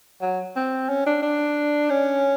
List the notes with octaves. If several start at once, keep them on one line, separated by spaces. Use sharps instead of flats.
F#3
C4
C#4
D4
D4
C#4